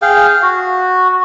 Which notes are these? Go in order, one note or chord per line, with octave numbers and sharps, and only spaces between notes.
G#4 F5 G5
F#4